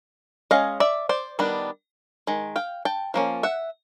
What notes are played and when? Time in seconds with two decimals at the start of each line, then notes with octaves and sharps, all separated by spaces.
0.51 G#3 C#4 D#5 F5
0.80 D5 E5
1.09 C5 D5
1.39 D#3 G3 B3 D4
2.27 D#3 G#3
2.56 F5 G5
2.85 G5 A5
3.14 F3 A#3 C#4
3.43 E5 F#5